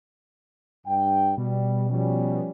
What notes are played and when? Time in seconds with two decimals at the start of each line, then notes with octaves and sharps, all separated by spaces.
0.87 G2 G5
1.38 B2 G3
1.90 F3 G3 C#4